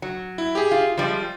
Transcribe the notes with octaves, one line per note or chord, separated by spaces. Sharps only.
F#3
E4
G4 G#4
F4
F3 G3 G#3 F4